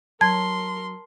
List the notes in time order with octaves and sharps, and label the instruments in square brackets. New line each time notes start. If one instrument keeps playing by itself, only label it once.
[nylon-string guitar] F#3 [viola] A#4 C6 [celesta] A5 [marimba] G#6